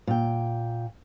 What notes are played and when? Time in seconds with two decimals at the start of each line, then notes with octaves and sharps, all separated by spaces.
0.07 A#2 G5